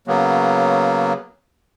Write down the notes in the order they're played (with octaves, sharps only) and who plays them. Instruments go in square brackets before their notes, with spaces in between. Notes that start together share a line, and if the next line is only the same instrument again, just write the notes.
[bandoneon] C#3 F#3 A#3 B3